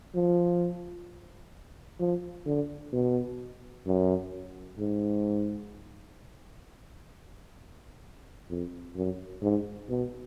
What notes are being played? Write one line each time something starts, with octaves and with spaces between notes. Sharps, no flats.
F3
F3
D3
B2
F#2
G#2
F2
F#2
G#2
B2